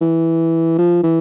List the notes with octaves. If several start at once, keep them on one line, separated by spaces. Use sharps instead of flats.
E3
F3
E3